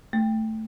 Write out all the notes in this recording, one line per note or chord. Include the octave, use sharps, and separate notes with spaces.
A3